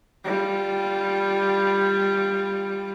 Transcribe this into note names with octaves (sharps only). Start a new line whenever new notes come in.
G3 F4